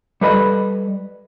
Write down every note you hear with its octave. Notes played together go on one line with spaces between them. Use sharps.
G3 A4 B4 D#5 B5